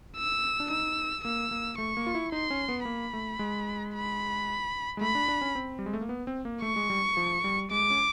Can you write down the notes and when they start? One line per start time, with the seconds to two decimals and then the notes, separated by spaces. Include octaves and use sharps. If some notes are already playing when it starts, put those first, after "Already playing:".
0.16 E6
0.60 D4
0.70 D#4 E6
1.24 A#3 E6
1.51 A#3
1.78 A3 C#6
1.97 A#3
2.07 F4
2.15 E4
2.32 D#4 C6
2.50 C#4
2.69 B3
2.85 A#3 B5
3.13 A3
3.39 G#3
3.93 B5
4.97 G#3
5.01 A3 B5
5.15 D4
5.28 D4
5.41 C#4
5.55 C4
5.79 G3
5.86 G#3
5.93 A3
6.01 A#3
6.09 B3
6.27 C4
6.45 A#3
6.62 A3 C#6
6.76 G#3
6.90 G3
7.17 F3
7.44 G3
7.71 G#3 D6
7.90 C#4